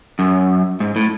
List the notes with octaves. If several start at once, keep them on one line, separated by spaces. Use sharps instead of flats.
F#2
G#2
A2